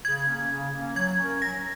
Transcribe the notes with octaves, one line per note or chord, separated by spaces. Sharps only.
C#3 G#6
A#3 C#4
C#3
A#3 C#4
F#3 G#6
C#4 A#4
F#3 A#6